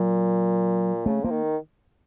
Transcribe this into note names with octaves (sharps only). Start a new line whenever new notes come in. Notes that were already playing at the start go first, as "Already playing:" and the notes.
Already playing: A#2 F#3
C#3 A3
F3 A#3
D#3